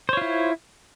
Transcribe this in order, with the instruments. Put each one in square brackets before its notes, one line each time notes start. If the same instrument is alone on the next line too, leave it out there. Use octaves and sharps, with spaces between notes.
[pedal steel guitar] C5
C#5
F4
E4